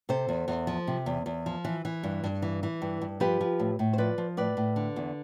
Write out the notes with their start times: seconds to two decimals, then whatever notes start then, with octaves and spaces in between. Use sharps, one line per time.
0.09 C3 A4 C5
0.29 E2
0.48 E2
0.67 F3
0.87 C3
1.06 E2
1.26 E2
1.46 F3
1.65 E3
1.85 E3
2.03 G2
2.24 G2
2.42 E3
2.63 E3
2.82 G2
3.01 G2
3.20 F3 G4 B4
3.41 F3
3.59 A2
3.79 A2
3.93 C5
3.98 F3 B4 D5
4.18 F3
4.37 A2 B4 D5
4.57 A2
4.76 D3
4.96 E2